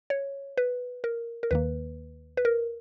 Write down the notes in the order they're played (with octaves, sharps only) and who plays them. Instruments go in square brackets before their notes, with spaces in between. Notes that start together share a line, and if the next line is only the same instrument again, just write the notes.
[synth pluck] C#5
B4
A#4
A#4
D#2 D#3 A#3 B4
B4
A#4